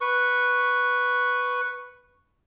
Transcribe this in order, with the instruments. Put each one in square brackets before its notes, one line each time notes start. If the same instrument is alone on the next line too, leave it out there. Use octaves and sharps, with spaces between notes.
[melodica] B4 C#6